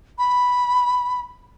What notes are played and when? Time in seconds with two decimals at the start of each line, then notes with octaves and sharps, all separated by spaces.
0.18 B5